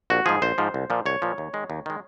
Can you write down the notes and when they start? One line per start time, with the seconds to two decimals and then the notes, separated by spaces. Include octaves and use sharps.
0.10 A#1 F#4
0.26 G#2 F3 G#4
0.42 A#1 C5
0.58 G#2 F3
0.74 C2
0.90 A#2 F3
1.06 C2 C#5
1.22 A#2 F3
1.38 D#2
1.54 D#3 G#3
1.70 D#2
1.86 D#3 G#3